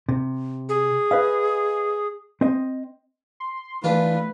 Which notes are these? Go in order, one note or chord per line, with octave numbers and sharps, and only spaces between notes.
C3
G#4
B4 D#5 F5
C4 D#5
C6
E3 A3 D4 F4 B4